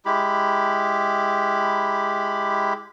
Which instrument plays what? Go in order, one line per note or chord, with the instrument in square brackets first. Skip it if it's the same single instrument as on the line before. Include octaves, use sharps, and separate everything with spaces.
[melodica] G#3 E4 G4 B5